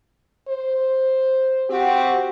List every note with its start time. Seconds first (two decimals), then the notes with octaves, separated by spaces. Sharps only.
0.48 C5
1.70 C4 F#4 G4